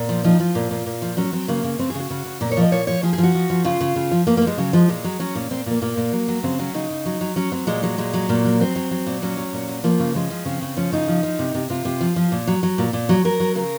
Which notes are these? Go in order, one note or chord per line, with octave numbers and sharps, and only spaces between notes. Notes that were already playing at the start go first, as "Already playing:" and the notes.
Already playing: A#2
F3
F3 D#4
F3 F4
A#2
A#2
A#2
F3
F#3 C#4
F#3 C4
C#3 A#3
C#3
C#3 C4
G#4
C#3 F#4
C#3
C#3
A#2 A#4
C#5
F3 D#5
A#2 C#5
F3 C#5
F3 G#4
G#4
F3
F#4
F3
F3
C#3 F4
C#3
C#3
F3
F3 A#3
A#3
F3
G#3
C#3 F#3
F3 G#3
A#2 G#3
F#3
F#3 C#4
A#2
A#2 C4
A#2 A#3
A#2 A#3
A#2
F#3
F#3
C#3 C4
F#3 C#4
C#3 D#4
C#3
F#3
F#3
F#3 C#4
F#3 C4
A#2 G#3
F#3 G#3
A#2 G#3
F#3
A#2 A#3
F#3
F#3 C4
F#3
F#3
A#2
F#3 C#4
F#3
A#2
F#3
F3 A#3
C#3
F3 G#3
F3
C#3 C4
C#3
F3 C#4
C#3 D#4
F3
F3
C3
C3
C3 F4
C3
F3
F3
A#2
F#3
F#3
A#2
A#2
F#3
F#3 A#4
F#3
C#3 A#4